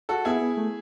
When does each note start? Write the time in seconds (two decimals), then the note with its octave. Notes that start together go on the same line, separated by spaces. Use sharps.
0.09 F#4 A4
0.25 B3 E4 G#4
0.41 B3
0.57 A3